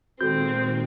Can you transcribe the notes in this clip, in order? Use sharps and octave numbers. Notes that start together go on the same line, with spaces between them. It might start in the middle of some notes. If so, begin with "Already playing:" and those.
A#2 D#3 G#3 C4 F#4 A4 G6